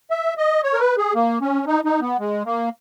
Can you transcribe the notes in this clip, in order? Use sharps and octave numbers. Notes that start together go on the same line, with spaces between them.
E5
D#5
C#5
A#4
B4
G#4
A#3
C#4
D#4
D#4
B3
G#3
A#3